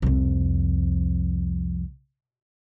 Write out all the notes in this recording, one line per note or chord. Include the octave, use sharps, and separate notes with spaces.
C2 F2